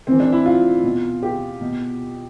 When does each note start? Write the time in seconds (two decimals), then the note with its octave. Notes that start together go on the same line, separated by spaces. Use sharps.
0.07 C3 E3 C4
0.20 D4
0.32 E4
0.46 F4
0.83 B2
1.23 G4
1.61 B2